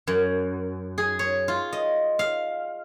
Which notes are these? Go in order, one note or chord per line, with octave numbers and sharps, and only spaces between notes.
F#2
G#4
C#5
F4
D#5
F5